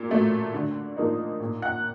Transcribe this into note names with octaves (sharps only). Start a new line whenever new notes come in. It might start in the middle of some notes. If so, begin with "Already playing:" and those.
Already playing: A#2
F#3 A3
D3
F3 A#3 D#4
A#2
F#5 F#6